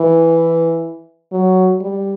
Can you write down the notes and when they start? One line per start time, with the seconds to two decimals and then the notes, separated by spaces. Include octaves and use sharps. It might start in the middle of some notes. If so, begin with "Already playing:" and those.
Already playing: E3
1.32 F#3
1.81 G3